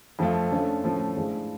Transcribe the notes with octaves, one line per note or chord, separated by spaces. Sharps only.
F2 F3 A3 F4
D3 F3 A3 C#4 F4
A2 F3 A3 C#4
A2 F3 G#3 D4 F4